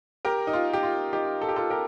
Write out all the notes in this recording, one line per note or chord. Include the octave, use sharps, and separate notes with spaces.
G4 A#4
D#4
F4
G4
F4
D#4 G4
A4
G4
F4 A4
G4 A#4